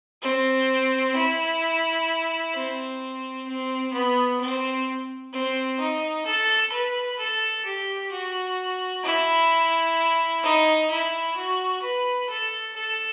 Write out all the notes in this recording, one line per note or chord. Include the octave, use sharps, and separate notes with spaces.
C4
E4
C4
C4
B3
C4
C4
D#4
A4
B4
A4
G4
F#4
E4
D#4
E4
F#4
B4
A4
A4